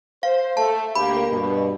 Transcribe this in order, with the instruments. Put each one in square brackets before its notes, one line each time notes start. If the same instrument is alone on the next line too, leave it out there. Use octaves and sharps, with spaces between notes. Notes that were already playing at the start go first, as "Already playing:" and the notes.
[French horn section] C5 [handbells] F5
[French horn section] A3 [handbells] A5
[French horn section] D2 A#3 G4 [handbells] B5
[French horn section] G2 B2